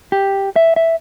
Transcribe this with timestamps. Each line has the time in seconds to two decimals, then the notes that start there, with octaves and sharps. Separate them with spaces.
0.12 G4
0.56 E5
0.76 E5